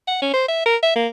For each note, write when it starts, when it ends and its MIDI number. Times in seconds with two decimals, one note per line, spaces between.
0.07 0.17 78
0.22 0.31 61
0.34 0.46 72
0.48 0.61 76
0.66 0.76 70
0.83 0.91 76
0.96 1.07 58